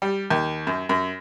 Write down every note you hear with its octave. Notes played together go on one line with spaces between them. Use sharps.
G3
D#2
F#2
F#2